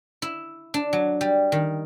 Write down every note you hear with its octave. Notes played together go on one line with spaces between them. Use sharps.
E4
D4
F#3
G3
D#3